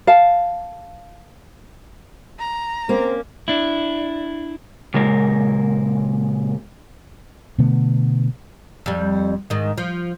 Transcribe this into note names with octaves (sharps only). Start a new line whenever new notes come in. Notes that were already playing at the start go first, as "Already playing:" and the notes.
F5 A5
A#5
A#3 C4 C#4
D4 E4
A#2 C#3 G#3 A#4
B2 D3 A3 B3
F2 G3
G#2 D#3
F3